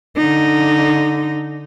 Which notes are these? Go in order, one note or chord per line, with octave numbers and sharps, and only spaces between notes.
D3 D#4